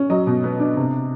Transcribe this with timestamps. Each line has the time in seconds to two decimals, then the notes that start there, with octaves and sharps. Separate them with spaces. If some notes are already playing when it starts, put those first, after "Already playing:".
Already playing: C#4
0.10 F#3 D#5
0.27 B2
0.44 B3
0.60 D4
0.77 C3